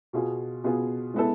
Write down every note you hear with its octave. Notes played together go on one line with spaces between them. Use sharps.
B2 B3 F4 G#4
B2 B3 F4 G#4
G#3 B3 E4 A4